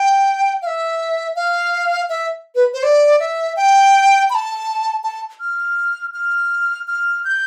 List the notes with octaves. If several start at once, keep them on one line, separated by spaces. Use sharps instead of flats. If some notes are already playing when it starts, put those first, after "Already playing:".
Already playing: G5
F5
E5
F5
E5
B4
C5
D5
E5
G5
B5
A5
A5
F6
F6
F6
G6